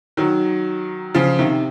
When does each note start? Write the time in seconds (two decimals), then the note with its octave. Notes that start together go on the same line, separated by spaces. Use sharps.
0.17 D#3 F#3
1.15 C#3 F3
1.39 C3 D#3